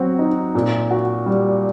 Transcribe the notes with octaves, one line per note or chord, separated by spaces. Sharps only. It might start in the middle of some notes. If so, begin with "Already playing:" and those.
Already playing: F#3 C4 F#4
D#4
A#2
F#4
G3